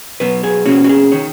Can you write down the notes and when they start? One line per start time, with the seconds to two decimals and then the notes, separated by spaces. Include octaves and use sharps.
0.20 B2 F#3 B3 B4
0.44 G#4
0.65 B2 A#3 C#4 F#4
0.84 F#4
0.89 G#4
1.12 D#3 C#5